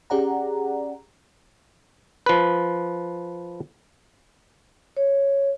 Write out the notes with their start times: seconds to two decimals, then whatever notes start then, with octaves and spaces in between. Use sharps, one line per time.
0.10 C#4 G4 G#4 D5 F#5 A#5
2.26 F3 B4
4.97 C#5